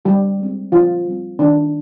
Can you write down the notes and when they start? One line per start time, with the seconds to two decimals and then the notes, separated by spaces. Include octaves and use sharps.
0.05 D3 G3 G4
0.39 G#3 C4
0.72 D3 F3 F4
1.06 G3 C4
1.39 D#3 D4